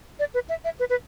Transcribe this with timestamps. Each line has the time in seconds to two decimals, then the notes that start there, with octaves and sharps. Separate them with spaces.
0.19 D5
0.34 B4
0.49 E5
0.64 E5
0.79 B4
0.90 B4